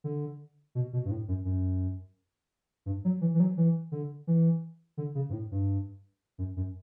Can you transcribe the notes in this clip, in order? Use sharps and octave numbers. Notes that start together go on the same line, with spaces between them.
D3
B2
B2
G2
A2
F#2
F#2
G2
F#3
E3
E3
F#3
E3
D3
E3
D3
C#3
G2
A2
G2
F#2
F#2